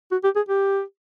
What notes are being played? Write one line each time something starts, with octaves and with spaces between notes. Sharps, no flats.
F#4
G4
G#4
G4